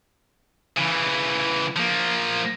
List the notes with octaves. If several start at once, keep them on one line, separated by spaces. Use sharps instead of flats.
C#3 E3
F3 A#3